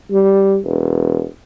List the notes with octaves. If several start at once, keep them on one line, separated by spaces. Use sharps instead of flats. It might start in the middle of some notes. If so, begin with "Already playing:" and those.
G3
E1